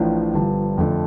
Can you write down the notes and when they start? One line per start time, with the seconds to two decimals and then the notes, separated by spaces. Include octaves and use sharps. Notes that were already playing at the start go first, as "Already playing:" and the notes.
Already playing: A1 A2 F3 D4
0.34 G1 G2 F3
0.77 F2 D3 A3